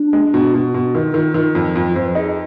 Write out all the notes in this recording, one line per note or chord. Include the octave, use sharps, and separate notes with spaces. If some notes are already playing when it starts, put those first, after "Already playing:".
Already playing: D4
G#3
B2
B2
B2
D#3 F4
D#3
D#3
F2
F2
F2 C5
B4
D#4 G#4